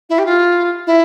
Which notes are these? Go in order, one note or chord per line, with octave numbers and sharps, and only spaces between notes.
E4
G4
F4
E4